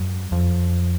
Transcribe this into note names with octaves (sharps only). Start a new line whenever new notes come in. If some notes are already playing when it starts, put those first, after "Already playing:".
Already playing: F#2
F2